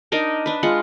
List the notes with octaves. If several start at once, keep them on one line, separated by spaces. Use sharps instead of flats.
D4 D#4 A#4 D#5
D4 B4
G#3 F4 F#5